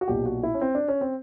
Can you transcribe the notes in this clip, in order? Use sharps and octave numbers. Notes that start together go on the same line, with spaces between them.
F#4
B1 A#2 G4
F#4
E4
C#4
C4
D4
C#4
C4